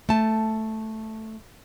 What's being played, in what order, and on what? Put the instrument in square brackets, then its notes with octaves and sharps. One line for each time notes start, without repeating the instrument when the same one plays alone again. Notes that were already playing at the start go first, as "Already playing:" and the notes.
[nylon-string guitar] A3 A5